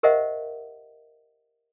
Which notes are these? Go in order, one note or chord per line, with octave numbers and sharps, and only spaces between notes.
G4 A#4 C5 D#5 E5 F#5